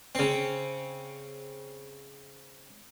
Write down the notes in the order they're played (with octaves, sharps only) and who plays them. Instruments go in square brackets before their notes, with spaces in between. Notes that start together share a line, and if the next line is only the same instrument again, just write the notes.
[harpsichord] C#3 C4